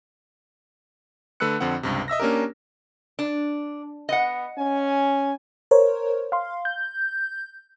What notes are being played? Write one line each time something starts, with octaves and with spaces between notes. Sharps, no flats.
D3 A3 B4 E6 F#6 C#7
F2 D3 C4 F#5
C#2 G2 C3
D#5 E5 E6 A#6
A#3 C#4 D4 G4 A#4
D4
B3 D#5 F#5
C#4 G#5
A#4 C5 C#5
F5 C6
G6